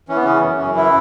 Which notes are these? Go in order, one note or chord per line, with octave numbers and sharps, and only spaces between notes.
E3 C#4
B3
C#3 C#4
F#2
F#2
E3 E4